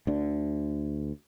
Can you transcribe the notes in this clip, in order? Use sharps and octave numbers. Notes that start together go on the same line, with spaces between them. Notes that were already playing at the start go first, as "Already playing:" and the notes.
D2 D3